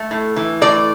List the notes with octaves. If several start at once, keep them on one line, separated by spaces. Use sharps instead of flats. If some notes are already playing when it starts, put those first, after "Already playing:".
Already playing: A3
A2
E3
A2 D5